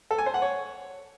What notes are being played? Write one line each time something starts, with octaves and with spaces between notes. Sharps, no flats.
A4
G#5
C5
F#5
C#5